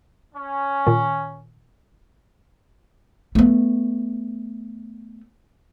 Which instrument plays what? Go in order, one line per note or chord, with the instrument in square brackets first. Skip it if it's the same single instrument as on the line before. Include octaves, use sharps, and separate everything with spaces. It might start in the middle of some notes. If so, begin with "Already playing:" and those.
[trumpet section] C#4
[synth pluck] A#2 D#3
[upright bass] A3 B3